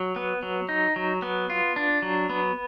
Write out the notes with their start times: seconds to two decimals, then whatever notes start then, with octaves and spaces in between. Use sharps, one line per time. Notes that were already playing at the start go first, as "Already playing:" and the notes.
Already playing: F#3
0.16 B3
0.43 F#3
0.69 D#4
0.96 F#3
1.22 B3
1.50 F4
1.76 D4
2.02 F#3
2.29 B3